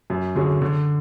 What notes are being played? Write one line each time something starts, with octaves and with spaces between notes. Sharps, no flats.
F#2
D3 F#3 C#4 G#4
D3